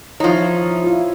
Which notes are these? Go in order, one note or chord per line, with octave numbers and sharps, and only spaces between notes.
F3 D#4 E4 C#5
E4
E4 F4